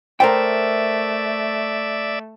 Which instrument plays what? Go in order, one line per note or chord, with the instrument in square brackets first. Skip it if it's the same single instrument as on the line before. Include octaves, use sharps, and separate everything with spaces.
[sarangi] A3 [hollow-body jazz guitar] A#4 C5 G5 [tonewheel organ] D5 E5